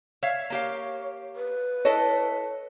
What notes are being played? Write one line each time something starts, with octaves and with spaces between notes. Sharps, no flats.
C#5 E5 F5
A#3 G4 C#5 F5
B4
E4 A4 C#5 D#5